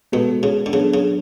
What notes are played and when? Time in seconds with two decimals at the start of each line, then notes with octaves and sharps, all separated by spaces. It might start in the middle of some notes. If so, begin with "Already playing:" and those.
0.12 B2 G#3 B3 F#4 A4
0.43 C#3
0.66 D3
0.73 C#3 F#3 B3 D4 A4
0.94 C#3